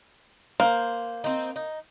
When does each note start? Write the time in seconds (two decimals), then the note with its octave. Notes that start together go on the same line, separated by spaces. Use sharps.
0.60 A#3 C5
1.24 C4 D#4
1.56 D#4